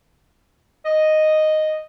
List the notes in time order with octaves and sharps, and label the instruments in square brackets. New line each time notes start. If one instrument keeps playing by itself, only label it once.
[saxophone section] D#5